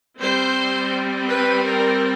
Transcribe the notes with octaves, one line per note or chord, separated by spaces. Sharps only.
G3 C4 C5
B4
A#4